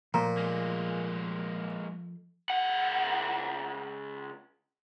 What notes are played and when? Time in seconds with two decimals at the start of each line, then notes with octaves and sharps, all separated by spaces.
0.14 A#2 F3 A3 C5 A#5
0.37 G#3 A#3
2.50 C#2 F#5